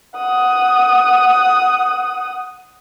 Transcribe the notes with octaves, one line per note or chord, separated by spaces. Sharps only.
F#5 D#6